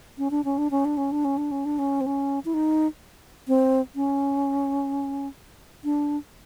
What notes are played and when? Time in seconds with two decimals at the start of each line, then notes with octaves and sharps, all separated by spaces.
0.18 C#4
0.31 D4
0.44 C#4
0.58 D4
0.71 C#4
0.85 D4
0.97 C#4
1.12 D4
1.25 C#4
1.37 D4
1.52 C#4
1.65 D4
1.79 C#4
2.01 C4
2.06 C#4
2.45 E4
2.54 D#4
3.48 C4
3.96 C#4
5.84 D4